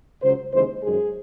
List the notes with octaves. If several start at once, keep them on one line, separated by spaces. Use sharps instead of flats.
C#2 C#3 F#3 C5
D#2 C#3 E3 G#3 C5
F#2 D#3 G#3 G#4